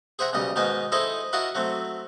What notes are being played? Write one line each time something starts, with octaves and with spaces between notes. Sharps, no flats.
G#4 C5 E5 F#5 A#5
B1 C#3 G3 D#5
G#2 B2 D#3 D#4 G#5 A5
D#4 E4 G#4 A4 C5 D#5
E4 F#4 A#4 D#5 F5 A5
F#3 A3 C4